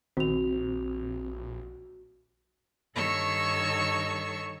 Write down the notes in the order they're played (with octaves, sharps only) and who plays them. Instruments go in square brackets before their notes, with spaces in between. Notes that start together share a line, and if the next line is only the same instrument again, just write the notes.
[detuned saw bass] A#1 [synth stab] D#3 [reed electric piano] C4 [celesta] F#4 F7
[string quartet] G2 D#3 A4 C#5 C#6 E6